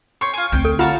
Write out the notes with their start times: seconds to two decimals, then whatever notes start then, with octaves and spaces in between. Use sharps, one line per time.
0.21 C#5 G5 C6 C#6
0.34 F4 G#5
0.52 D2 C4 G5
0.65 A4
0.79 F4 F#4 C#5 F5 A5 A#5